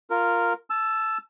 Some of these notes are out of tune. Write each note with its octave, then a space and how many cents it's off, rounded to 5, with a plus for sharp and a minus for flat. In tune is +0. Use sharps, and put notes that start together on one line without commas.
F4 +0 A#4 -5
A5 -20 E6 +15